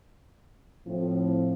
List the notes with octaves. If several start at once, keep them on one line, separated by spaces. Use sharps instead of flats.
A2 F3 C4